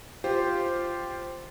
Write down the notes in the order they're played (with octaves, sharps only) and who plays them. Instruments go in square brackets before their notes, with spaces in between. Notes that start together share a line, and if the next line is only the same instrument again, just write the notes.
[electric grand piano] F4 G4 C5